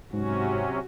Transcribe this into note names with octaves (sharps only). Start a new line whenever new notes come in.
G#2 C3 F#3 C#4 F#4